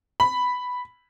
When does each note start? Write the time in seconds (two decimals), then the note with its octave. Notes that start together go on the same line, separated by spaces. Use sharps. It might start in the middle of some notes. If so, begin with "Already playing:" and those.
0.20 B5